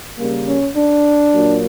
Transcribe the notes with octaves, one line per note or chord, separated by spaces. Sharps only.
C#3 G3 A#3
C#4
D4
A#2 F#3 A#3